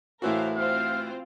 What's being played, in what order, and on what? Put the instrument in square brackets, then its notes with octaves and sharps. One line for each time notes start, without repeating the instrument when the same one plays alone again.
[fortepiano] A2 E3 F#4 [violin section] A#4 C5 F5
[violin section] C4 F4 C5 [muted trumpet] F5